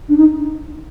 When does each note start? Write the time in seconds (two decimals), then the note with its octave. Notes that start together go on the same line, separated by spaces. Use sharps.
0.09 D4
0.17 D#4